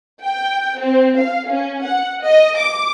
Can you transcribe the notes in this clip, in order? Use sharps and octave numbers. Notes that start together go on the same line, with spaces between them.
G5
C4
F5
C#4
F#5
D#5
D6